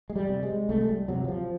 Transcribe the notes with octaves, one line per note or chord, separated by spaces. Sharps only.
G#3
G3
C3
G#3
C2 A3
G#3
G3
C3 F#3
F#3
F3